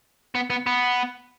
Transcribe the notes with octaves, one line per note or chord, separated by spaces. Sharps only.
B3
B3
B3